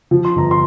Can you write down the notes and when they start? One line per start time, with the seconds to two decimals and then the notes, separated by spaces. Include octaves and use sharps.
0.11 F3
0.25 C6
0.35 G1 A#5
0.51 C6